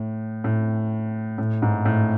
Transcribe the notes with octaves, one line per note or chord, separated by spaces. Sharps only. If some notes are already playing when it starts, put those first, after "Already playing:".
Already playing: A2
A2
A2
G#2
A2